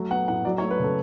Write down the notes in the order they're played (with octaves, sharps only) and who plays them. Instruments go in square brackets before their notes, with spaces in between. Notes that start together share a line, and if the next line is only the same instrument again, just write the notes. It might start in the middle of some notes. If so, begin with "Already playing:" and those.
Already playing: [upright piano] F#3 A3
B3 F#5
A2 F#5
F#3 D5
C#5
A3
B4
C#3 A4